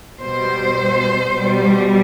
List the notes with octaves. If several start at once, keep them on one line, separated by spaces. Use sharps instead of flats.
B2 G3 C5
B2 G3